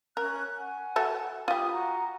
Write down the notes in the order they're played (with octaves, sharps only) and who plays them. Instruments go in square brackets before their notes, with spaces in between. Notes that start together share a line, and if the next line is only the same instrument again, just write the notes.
[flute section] C#4 F#6 [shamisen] A#4
[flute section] F#5 G#5
[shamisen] F#4 A4 E5
[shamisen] F4 G4 [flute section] B5 D#6
[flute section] F#4 A#5